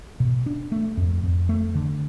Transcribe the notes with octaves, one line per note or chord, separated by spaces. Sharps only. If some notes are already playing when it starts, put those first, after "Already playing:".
B2
D4
A3
F2
F2
A3
D3